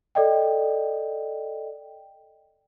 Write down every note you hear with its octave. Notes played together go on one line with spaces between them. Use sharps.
A4 D5 D#5 G5